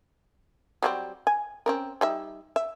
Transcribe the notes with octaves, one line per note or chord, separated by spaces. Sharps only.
F#3 G3 C4
G#5
C4 C#4 A#4
G3 D#4 E5
E5